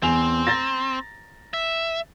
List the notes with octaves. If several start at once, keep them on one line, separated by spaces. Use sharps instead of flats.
E2 C4 G#5 F7
A#5 A6 A#6
E5